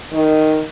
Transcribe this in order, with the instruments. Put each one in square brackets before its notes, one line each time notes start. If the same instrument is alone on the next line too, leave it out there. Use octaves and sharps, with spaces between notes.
[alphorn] D#3